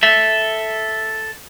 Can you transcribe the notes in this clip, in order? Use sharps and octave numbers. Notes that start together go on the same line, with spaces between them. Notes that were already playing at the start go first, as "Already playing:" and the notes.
A4 E5